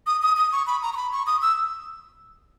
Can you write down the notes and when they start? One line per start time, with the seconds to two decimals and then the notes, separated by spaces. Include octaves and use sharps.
0.07 D#6
0.22 D#6
0.37 D#6
0.52 C#6
0.67 B5
0.82 A#5
0.93 C#6
0.97 B5
1.12 C#6
1.27 D#6
1.42 E6